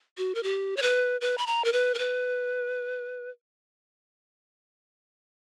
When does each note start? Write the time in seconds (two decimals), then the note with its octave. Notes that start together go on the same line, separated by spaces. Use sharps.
0.18 F#4
0.35 A#4
0.43 G4
0.77 C#5
0.82 B4
1.21 B4
1.38 B5
1.47 A#5
1.65 A#4
1.73 B4
1.94 A#4
1.99 B4